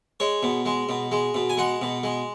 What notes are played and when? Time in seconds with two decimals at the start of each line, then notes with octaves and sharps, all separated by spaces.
0.20 G#3 C#5
0.43 B2
0.66 G#3
0.89 B2
1.12 G#3
1.34 B2
1.50 G#5
1.57 G#3 F#5
1.82 B2
2.03 G#3